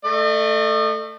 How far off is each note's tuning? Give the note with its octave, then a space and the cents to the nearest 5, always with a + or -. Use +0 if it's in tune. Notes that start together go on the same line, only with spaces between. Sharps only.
A3 +10 D#5 -40